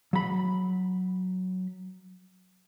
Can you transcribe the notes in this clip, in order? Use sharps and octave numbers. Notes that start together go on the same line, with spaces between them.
F#3 B5